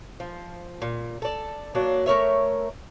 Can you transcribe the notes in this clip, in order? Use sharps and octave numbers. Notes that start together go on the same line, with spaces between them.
F3
A#2
A4 D5
F#3 A#3 D4
A3 A#4 C#5 E5